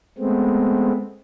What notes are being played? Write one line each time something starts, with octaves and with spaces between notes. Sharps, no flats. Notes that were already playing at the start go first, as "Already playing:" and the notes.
G#3 A3 B3 C4